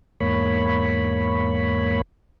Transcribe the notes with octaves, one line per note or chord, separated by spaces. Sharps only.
E2 G#2 A#3 C#5 B5